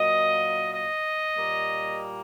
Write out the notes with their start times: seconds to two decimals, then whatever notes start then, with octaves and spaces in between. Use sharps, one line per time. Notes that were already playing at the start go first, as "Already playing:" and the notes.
Already playing: A#2 F#3 A#3 D#5
0.74 D#5
1.36 A#2 G3 A#3